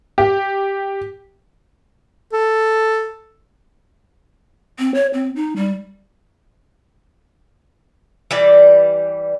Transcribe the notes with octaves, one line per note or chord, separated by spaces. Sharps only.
G4
A4
C4
C#5
C4
D#4
G3
E3 G3 D5